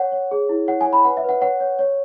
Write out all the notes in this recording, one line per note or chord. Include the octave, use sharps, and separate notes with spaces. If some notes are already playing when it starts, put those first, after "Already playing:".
Already playing: C#5 F#5
C#5
G#4
E4
C#5 F#5
G#5
C#5
B5
B4 F#5
E5
B4
F#5
C#5 F#5
C#5
C#5